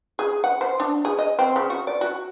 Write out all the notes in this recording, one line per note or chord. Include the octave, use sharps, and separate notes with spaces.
G#4
F#5
C5
D4
G#4
D#5
C4
C#3
F#4
D5
F#4